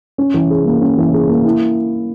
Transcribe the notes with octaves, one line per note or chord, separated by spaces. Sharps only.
C#4
E3
G#4
A#3
C#4
E3
G#4
A#3
E4